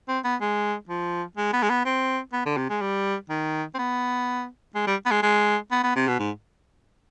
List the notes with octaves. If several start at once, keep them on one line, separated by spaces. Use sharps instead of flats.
C4
B3
G#3
F3
G#3
B3
G#3
B3
C4
B3
D3
C3
G#3
G3
D#3
C4
B3
G#3
G3
B3
G#3
G#3
B3
B3
C3
B2
G#2